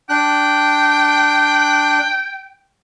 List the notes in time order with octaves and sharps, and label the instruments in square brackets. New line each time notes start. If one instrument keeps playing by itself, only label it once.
[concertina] D4 F#6 [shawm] G5